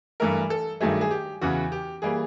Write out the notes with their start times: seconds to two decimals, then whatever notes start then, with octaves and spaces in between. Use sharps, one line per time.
0.20 G2 E3 A3 A#4
0.50 A4
0.81 G2 D#3 F#3 A3 G#4
1.01 G#4
1.11 G4
1.41 E2 C#3 E3 F#4
1.72 G4
2.02 E3 G3 A#3 G#4